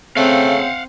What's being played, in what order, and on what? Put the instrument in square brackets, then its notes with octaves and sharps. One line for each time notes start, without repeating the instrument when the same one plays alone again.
[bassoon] C#3 [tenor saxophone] A3 [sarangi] C4 [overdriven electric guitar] F5 F#5